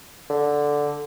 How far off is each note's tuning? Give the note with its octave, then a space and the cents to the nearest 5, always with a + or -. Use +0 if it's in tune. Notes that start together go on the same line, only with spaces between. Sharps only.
D3 -5